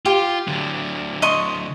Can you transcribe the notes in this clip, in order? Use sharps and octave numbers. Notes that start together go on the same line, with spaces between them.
F4 G4
D3 F#3
D#5 C6 C#6